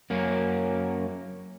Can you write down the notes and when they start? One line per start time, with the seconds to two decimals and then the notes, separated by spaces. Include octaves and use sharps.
0.10 F#2 A#3 C#4